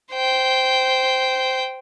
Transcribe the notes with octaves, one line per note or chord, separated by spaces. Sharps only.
C5 G5